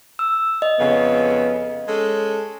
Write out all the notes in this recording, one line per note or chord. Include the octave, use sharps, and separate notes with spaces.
E6
D#5
F2 C#3 B3
G#3 C#4 A4